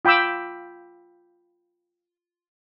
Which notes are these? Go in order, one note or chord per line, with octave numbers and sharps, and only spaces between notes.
F4 G5 B5 D6 E6